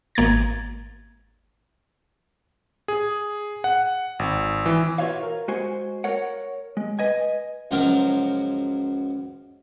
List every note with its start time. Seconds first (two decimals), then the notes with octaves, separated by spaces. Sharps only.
0.15 G#1 A#3 G#6 A6
2.88 G#4
3.64 F#5
4.19 G#1
4.66 E3
4.98 F4 F#4 B4 C#5 E5 F5
5.23 A#4
5.48 G#3 F#4 C5 G#5
6.04 A#4 C#5 F#5
6.77 G#3
6.99 B4 D#5 G#5
7.71 C#2 F#2 F3 F#3 A#4